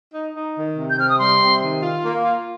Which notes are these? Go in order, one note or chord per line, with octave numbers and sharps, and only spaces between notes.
D#4
D#4
D#3
C3
G6
C3 F6
D#6
G3 C6
C3
D#3
F4
A#3
F4